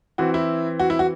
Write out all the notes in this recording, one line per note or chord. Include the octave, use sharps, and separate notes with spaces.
E3 C4 F#4
E4
F#4
E4
F#4